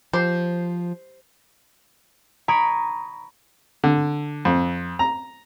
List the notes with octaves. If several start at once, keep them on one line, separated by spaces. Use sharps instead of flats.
F3 G4 C5
A#5 B5 C#6 D#6 G#6 D7
D3
F2
A#5